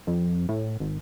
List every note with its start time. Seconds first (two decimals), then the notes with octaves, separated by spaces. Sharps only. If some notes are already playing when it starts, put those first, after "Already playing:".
0.07 F2
0.49 A2
0.80 G#1